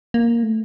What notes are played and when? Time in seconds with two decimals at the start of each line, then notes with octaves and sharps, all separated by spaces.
0.14 A#3
0.43 A3